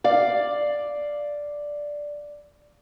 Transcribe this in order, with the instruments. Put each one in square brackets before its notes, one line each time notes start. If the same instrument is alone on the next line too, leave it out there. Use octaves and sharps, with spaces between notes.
[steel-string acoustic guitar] D5 F5